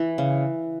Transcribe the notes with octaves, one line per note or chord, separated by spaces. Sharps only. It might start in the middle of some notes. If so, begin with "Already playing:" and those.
Already playing: E3
C#3